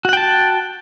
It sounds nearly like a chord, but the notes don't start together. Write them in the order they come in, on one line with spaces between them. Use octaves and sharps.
F#4 F#5 G5 A5